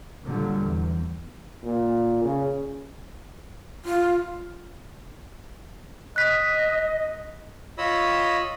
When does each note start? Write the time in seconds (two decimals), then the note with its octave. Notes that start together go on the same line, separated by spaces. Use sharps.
0.25 A#2 D3 F#3 G3
0.59 E2
1.64 A#2
2.24 C#3
3.85 F4
6.16 D#5 F#6 B6
7.78 F4 C#5 D#5 B5 D#6 E6